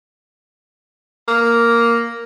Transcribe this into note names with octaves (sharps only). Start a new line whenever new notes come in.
A#3